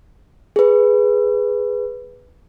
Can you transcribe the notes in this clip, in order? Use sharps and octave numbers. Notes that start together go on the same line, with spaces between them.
G#4 B4